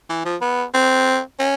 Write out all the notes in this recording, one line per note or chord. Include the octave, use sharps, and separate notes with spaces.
E3
F3
B3
C4
C#4